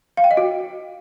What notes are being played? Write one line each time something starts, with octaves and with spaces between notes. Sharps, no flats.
F5
G5
D#5
F#4